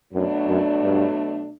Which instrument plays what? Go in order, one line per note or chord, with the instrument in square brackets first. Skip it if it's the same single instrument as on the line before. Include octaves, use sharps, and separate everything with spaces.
[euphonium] F#2 [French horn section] B2 F#3 A3 D4
[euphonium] F#2
G2